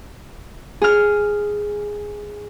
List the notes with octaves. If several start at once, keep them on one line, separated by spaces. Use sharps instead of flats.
G#4 F6